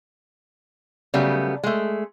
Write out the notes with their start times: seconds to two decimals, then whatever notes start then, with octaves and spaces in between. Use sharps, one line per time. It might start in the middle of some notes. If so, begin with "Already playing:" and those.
1.14 C#3 F#3 G3 A3 B3
1.63 G#3 A3